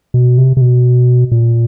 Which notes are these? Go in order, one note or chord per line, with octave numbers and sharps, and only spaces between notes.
B2
C3
C3
B2
A#2